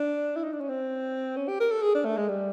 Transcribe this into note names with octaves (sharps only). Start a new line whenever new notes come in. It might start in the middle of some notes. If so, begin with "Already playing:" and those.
Already playing: D4
E4
D#4
D4
C#4
C4
C#4
G4
A#4
A4
G#4
D4
A3
G#3
G3